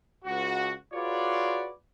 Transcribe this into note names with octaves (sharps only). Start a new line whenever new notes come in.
C#2 F#4
F4 F#4 G#4 B4 C#5 D5